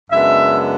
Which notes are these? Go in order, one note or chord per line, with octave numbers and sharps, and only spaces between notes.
F#2 C#3 G#3 B3 D4 E5